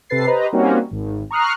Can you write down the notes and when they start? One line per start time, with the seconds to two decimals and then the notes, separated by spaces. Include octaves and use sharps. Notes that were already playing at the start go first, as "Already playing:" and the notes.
0.09 C3 A4 B4 A6 C7
0.27 G4 B4 C5 D#5 A#5
0.53 G3 A#3 C4 C#4 D#4 F#4
0.91 G#1
1.31 A#5 C#6 D#6 F6 F#6 C7